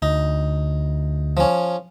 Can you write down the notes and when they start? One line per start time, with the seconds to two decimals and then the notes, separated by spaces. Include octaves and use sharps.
0.02 D2 D#4
1.37 F3 C#4